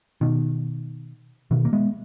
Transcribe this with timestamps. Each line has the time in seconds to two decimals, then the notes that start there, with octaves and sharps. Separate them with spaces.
0.21 B2 D#3
1.51 B2 D#3
1.65 A#3
1.73 G#3 B3